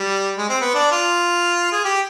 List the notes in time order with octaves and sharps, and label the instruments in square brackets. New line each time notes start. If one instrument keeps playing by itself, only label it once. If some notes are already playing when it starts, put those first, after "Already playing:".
Already playing: [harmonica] G3
G#3
C4
B3
D4
F4
G#4
G4